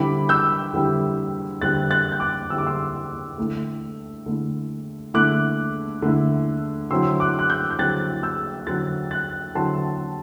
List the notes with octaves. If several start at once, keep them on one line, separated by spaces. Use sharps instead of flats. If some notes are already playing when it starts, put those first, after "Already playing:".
Already playing: D3 G3 C4 E4 B5 D6
E6 G6
D3 G3 C4 E4
D3 G3 C4 E4 F#6 A6
F#6 A6
G6
D6 F#6
D3 G3 C4 E4 E6
D6
C6 E6
D3 A3 E4
D3 A3 E4
D3 A3 E4 D6 F#6
D3 A3 E4
D3 F#3 C4 E4 C6 E6
D6 F#6
F#6
E6 G6
G6
D3 F#3 C4 E4 F#6 A6
E6 G6
D3 F#3 C4 E4 F#6 A6
F#6 A6
D3 F#3 C4 E4 A5 C6